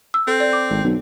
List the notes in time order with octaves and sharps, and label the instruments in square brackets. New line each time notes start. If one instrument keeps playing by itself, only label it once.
[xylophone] E6
[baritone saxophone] C4 [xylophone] A4
[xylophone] D5
D6
[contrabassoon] G#1
B1